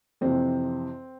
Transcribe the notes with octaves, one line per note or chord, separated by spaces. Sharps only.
F2 C3 E3 C4